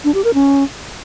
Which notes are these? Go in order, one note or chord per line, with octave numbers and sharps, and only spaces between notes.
D4
G4
A#4
C#4